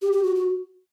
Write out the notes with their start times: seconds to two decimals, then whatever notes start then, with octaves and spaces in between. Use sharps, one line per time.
0.02 G4
0.12 G4
0.23 F#4
0.35 F#4